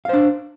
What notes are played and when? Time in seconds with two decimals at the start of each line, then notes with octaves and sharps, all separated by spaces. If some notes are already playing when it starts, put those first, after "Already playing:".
0.05 F5
0.09 C5
0.13 D4